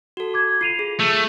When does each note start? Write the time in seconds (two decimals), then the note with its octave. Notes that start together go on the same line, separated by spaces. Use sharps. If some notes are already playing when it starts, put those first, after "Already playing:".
0.17 F#4 A4
0.34 D6 G#6
0.61 F4 C7 D#7 F7
0.79 G#4
0.99 A3 D#7 F7 F#7